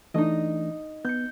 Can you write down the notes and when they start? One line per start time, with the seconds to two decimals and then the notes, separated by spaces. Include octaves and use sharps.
0.14 E3 A3 D4 D#4 D#5
1.05 B3 G6 C#7